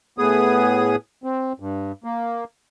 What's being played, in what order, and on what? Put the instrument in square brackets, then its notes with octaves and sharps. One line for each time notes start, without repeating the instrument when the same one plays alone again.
[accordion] A2 B3 G#4 D#6
C4
G2
A#3